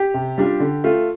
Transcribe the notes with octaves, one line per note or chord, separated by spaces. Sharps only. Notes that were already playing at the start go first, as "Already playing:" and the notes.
Already playing: G4
C3
G3 D4 F4
D3
A3 F4